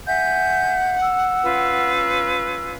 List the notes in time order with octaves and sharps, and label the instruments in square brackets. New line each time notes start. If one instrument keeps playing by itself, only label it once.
[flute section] E5 G6 [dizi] F#5 [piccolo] G#5
[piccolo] E6
[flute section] C#4 F4 B4